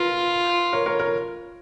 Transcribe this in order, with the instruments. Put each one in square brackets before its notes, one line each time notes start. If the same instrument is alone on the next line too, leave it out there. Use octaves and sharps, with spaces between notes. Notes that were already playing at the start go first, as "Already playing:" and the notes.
Already playing: [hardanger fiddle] F4 [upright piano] A#4 B4
[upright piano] A#4 C#5
A#4 C#5
A#4 C#5